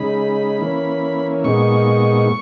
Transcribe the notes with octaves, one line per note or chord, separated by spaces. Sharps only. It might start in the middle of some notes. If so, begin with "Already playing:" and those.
Already playing: C#3 G#3 D#4 B5
E3 A#3 C#4
A#2 G#3 B3 D#4 C#6